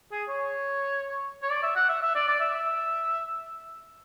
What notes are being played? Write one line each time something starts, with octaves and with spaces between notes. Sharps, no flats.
G#4
C#5
C#5
D5
E5
F#5
E5
E5
D5
D5
E5
E5